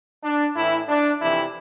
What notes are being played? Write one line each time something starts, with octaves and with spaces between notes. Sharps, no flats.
D4
A2 E3 E4
D4
F2 C3 E3 E4